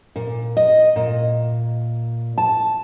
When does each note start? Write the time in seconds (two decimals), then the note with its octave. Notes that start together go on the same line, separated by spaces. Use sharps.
0.16 A#2
0.57 D#5
0.96 A#2
2.38 A5